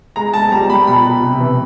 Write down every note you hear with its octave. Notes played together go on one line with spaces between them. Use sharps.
G#3 A#5
G#3 A5
G3 A#5
G3 B5
B2 B5
B2
C3
E3